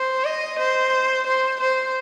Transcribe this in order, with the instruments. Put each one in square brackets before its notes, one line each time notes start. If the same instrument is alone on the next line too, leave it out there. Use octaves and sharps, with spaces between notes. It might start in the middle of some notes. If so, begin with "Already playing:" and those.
Already playing: [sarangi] C5
D#5
C5
C5
C5